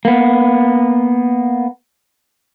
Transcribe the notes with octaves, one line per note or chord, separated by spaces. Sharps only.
A#3 B3